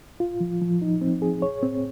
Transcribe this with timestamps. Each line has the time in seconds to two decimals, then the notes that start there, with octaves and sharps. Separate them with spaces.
0.20 F4
0.40 F3
0.62 F3
0.82 D#4
1.01 C4
1.22 G#4
1.42 C#5
1.63 C4